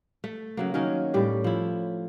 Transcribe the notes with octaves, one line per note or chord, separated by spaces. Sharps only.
A3
C#3 F#3 A#3
D#3 F#3 C#4 A#4
A2 G3 G4
F3 E4